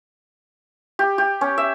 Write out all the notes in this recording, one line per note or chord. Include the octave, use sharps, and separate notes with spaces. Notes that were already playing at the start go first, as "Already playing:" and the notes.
G4
G4
C#4
E5